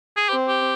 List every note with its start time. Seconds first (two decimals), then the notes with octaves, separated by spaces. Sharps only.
0.16 G#4
0.29 C4 G4
0.48 G4